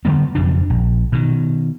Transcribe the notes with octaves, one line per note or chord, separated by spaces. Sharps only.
D3 F#3 G3 B3
F#1 F2 B2 D4
A#1
B2 D#3